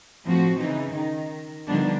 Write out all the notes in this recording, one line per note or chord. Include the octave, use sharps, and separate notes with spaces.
A2 F3 C4 F#4
C#3 E3 D#4
D#3
D3 D#3 F3 G3 B3 D4